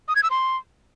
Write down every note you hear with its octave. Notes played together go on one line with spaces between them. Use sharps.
D#6
G#6
E6
C6